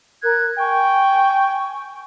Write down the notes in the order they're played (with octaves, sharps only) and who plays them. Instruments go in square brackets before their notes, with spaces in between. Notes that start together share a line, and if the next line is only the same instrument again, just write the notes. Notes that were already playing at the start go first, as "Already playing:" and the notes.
[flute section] A#4 F#6 G#6
[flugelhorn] G5 [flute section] G#5 C#6